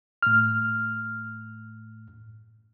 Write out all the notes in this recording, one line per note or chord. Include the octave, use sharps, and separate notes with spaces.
A2 F6